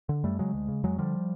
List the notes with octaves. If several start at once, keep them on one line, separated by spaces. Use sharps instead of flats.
D3
F#2 G3 A3
C#3 F#3 G#3
D2
C#3
F2 F#3 G#3
D3 F3 G3